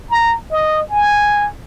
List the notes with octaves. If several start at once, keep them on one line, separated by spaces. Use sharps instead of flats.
A#5
D#5
G#5